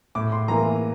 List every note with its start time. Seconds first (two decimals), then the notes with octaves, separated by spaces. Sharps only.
0.15 A2 D6
0.32 C6
0.48 E3 A#3 A#5